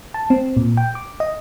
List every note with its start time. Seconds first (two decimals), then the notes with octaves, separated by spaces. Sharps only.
0.14 A5
0.30 C4
0.57 A#2
0.77 G5
0.95 D6
1.20 D#5